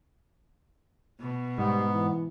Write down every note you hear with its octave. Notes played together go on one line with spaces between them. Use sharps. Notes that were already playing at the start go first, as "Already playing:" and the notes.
B2
G#2 G3 B3
E3